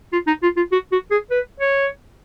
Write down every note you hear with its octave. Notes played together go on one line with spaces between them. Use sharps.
F4
D#4
F4
F4
F#4
F#4
G#4
B4
C#5